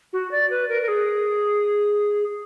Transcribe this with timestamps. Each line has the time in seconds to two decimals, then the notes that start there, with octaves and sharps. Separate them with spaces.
0.13 F#4
0.31 D5
0.50 B4
0.69 A#4
0.82 A#4
0.88 G#4